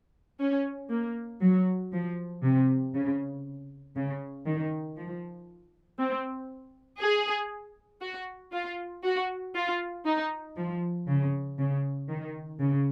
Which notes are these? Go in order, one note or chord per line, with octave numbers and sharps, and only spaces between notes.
C#4
A#3
F#3
F3
C3
C#3
C#3
D#3
F3
C4
G#4
F#4
F4
F#4
F4
D#4
F3
C#3
C#3
D#3
C#3